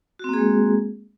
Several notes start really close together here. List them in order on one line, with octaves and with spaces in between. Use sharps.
F#4 C4 A#3 G#4 G#3